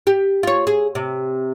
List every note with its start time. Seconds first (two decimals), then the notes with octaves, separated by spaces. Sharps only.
0.07 G4
0.43 F4 C#5
0.67 G#4
0.95 C3